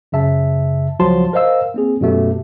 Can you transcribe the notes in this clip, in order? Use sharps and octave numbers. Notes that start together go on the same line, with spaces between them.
F#2 C#3 E5 A5
C#2 F3 F#3 F#4 A5 C6
A#4 C5 D#5 F5 E6
A#3 C4 G#4
F#2 B2 A3 G4